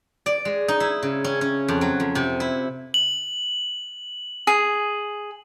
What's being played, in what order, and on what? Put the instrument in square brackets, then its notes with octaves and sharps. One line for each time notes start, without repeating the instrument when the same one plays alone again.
[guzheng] D5
G#3
D#4
E4
C#3
C#4
C#4
F2
F#3
F2
C3
E4
[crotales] F#7
[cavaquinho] G#4